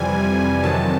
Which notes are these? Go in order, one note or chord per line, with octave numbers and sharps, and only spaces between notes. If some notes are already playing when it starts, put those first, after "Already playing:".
Already playing: F2 C3 E3 G3 G#5
F2 C3 D#3 F#3 A5